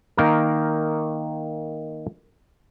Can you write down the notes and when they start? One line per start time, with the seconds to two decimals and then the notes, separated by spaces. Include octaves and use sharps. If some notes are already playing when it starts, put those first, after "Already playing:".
0.17 D#3 A#3 A#4